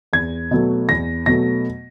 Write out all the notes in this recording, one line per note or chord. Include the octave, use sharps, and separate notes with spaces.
E2 G#6
B2 F#3 A3
E2 A#6
B2 F#3 A3 A#6